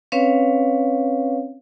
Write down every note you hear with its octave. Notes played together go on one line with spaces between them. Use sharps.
C4 C#4 B4 C#5 F5